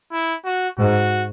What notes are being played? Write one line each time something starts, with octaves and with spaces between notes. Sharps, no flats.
E4
F#4
G#2 F#4